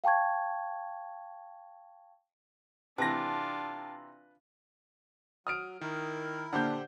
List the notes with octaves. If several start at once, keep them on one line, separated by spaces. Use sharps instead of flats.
F5 G5 A5 C#6 G#6
C3 E3 D4 F4 B4 G5 A5 A#6
F#3 D#6 F6 D7
D#3 E4 A#4
A#2 D3 D4 G4 C5 F#5 G6